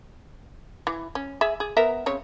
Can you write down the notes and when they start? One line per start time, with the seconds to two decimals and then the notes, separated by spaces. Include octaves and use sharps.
0.87 E3
1.15 C#4
1.41 G#4 E5
1.60 G#4
1.77 B3 A#4 E5
2.06 C#3 C4 C#5